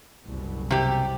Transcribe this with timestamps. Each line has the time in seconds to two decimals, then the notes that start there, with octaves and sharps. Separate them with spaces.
0.24 F#1 C2 B2
0.70 C3 G4